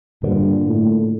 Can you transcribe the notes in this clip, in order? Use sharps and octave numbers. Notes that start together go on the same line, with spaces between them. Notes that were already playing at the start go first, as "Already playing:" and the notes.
G2 A#2 D3
A2